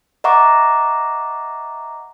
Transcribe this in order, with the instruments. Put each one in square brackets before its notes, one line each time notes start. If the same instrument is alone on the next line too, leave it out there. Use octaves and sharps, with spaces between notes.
[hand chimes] D#5 E5 F#5 A#5 C#6 D6